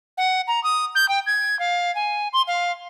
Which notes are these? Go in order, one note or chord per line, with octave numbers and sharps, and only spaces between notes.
F#5
A#5
D#6
G6
G5
G#6
F5
G#5
C6
F5